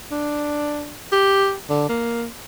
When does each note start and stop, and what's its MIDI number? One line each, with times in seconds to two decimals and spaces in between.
0.12 0.93 62
1.12 1.54 67
1.70 1.88 50
1.89 2.26 58